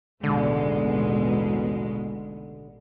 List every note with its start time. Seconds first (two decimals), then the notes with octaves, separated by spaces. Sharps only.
0.23 A1 D#2 B2 D3 G#3